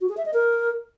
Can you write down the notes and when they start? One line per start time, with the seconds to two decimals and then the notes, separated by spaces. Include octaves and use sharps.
0.01 F#4
0.09 G#4
0.17 E5
0.25 D#5
0.34 A#4